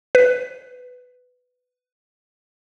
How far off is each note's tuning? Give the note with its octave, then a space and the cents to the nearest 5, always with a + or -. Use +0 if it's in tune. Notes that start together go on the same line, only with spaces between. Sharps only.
B4 +10